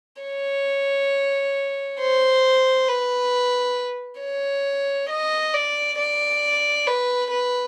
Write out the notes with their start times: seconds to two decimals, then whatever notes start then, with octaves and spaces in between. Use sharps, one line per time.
0.22 C#5
2.00 C5
2.88 B4
4.21 C#5
5.10 D#5
5.54 D5
5.99 D5
6.87 B4
7.31 B4